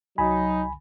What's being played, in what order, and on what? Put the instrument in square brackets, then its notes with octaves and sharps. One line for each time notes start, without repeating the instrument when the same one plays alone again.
[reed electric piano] C2 G#5 B5 [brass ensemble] F#3 D#4